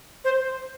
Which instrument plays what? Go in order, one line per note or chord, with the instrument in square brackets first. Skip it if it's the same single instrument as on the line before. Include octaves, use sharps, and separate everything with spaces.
[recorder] C5